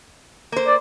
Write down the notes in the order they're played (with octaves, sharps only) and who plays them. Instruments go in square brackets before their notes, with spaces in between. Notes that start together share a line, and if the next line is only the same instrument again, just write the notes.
[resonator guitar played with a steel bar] A#3 C5
[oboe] D5